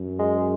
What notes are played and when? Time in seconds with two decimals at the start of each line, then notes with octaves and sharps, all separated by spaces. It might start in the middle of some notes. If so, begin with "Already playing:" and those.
Already playing: F#2
0.19 G#3